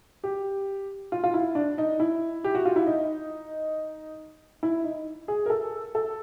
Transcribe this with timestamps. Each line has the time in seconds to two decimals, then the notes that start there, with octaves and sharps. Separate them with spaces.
0.24 G4
1.12 F4
1.24 F4
1.34 E4
1.55 D4
1.78 D#4
2.00 E4
2.44 G4
2.55 F#4
2.65 F4
2.76 E4
2.87 D#4
4.63 E4
4.84 D#4
5.28 G#4
5.46 A#4
5.50 A4
5.95 A4